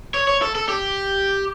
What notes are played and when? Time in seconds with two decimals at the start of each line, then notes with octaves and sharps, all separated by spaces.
0.14 C#5
0.27 C#5
0.42 A4
0.55 A4
0.69 G4